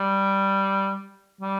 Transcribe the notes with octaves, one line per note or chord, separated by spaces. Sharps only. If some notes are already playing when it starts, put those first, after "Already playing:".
Already playing: G3
G3